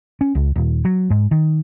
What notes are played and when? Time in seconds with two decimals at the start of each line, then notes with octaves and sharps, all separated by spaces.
0.21 C#4
0.35 C#2
0.56 D#1
0.85 F#3
1.10 G#2
1.31 D#3